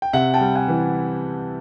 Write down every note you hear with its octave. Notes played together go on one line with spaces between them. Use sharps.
G5
C3 E5 F#5
G5 A5
G3
F#5 G#5
E3